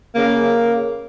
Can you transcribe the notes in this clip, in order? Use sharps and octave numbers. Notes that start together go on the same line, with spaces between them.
C#3 A#3